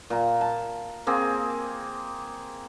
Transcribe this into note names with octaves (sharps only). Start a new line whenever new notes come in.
A#2 A#5
A5
A#3 C4 G#4